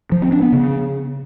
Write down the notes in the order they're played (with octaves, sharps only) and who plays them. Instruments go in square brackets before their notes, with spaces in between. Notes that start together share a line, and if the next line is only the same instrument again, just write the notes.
[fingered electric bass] F3
C4
D4
B3
C#3